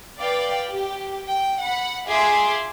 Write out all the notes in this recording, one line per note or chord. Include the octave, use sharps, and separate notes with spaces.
B4 D5 F5 G5
G4
G5
F#5 B5
F4 G#4 E5 C6 D6